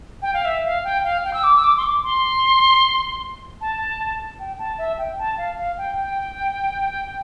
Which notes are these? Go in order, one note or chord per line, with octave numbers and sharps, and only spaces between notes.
G5
F5
E5
F5
G5
F5
G5
E6
D6
E6
D6
C6
D6
C6
A5
G5
A5
E5
G5
A5
F5
F5
G5
G5